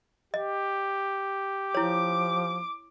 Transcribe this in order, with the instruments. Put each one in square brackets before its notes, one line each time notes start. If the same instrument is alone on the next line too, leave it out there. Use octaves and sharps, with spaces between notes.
[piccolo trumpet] G4 [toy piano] D#5
[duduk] F3 [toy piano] E4 C#5 [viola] D6